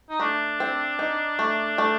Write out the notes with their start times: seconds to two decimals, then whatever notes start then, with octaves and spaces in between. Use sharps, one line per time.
0.10 D#4
0.20 A3 D4
0.60 C4
0.99 D#4
1.39 A3
1.78 A3